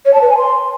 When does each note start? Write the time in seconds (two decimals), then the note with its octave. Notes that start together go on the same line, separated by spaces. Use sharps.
0.06 C#5
0.14 A5
0.22 B4
0.30 G#5
0.38 C6